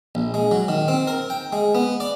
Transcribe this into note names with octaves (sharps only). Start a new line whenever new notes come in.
A#1
G#3
F#3
D#3
C4
A#4
G5
G#3
B3
D5